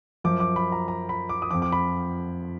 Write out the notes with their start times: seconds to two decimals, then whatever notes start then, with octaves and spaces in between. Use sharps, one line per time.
0.24 F#2 F3 D6
0.40 D6
0.56 B5
0.72 A#5
0.88 A#5
1.09 B5
1.29 D6
1.42 D#6
1.51 F2 F3 D6
1.62 D6
1.72 B5